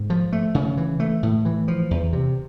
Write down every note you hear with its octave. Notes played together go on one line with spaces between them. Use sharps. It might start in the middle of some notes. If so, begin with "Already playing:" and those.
Already playing: G#2
F3
A3
C#3
E3
A3
A2
E3
F3
E2
C3